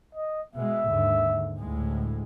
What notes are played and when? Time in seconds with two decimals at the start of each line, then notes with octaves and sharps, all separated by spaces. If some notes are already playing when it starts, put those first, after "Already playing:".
0.15 D#5
0.55 B2 G#3 E5
0.87 D#2 G#2 D3
1.59 D2 A2 G#3